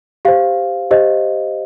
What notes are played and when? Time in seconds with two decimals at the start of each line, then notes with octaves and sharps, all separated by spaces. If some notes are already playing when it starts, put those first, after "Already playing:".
0.25 G4 C5 F5
0.91 G4 C5 D#5